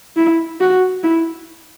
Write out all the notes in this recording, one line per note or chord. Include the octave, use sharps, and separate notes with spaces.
E4
F#4
E4